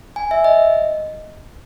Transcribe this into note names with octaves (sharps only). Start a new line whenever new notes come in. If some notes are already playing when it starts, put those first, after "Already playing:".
G#5
E5
D#5